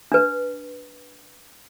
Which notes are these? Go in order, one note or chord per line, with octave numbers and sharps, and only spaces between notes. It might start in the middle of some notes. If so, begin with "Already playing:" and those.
D4 B4